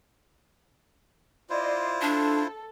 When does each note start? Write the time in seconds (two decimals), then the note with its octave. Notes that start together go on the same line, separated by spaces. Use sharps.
1.50 E4 F4 C5 D5 D#5
2.02 D4 A4